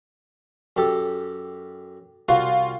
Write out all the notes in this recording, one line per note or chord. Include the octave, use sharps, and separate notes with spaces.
F#2 G4 A4
C2 F4 F#4 F5